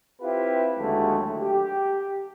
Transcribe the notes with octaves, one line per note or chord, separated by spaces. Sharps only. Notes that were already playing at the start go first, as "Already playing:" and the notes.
C4 E4 F4 G4 B4
D#2 D3 F#3 G#3 A3
G4